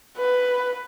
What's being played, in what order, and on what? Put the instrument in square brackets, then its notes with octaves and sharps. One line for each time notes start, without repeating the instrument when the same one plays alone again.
[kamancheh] B4